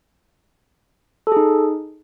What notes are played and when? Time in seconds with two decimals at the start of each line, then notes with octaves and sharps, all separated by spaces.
1.27 A4
1.32 G#4
1.37 D#4